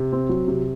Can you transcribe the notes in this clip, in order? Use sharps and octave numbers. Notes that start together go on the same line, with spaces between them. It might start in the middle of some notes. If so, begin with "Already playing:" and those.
Already playing: C3
C4
F#3
C3